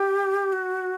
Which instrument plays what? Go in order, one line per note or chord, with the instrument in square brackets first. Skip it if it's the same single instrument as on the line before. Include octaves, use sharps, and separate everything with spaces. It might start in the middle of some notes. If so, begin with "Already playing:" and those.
Already playing: [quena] G4 [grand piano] G5
[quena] F#4